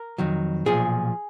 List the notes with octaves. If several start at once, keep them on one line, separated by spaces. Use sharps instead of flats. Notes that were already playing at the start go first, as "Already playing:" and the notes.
Already playing: A#4
F2 D#3 F#3
B1 A#2 F3 G#4